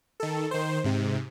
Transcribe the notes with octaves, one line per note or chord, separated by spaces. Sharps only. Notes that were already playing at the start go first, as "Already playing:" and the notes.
D#3 A4
D#3 C5
G#2 C3